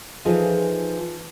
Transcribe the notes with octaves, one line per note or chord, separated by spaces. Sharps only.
E3 F3 D#4 F4 G#4 A4